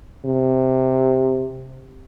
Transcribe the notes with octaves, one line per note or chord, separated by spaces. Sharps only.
C3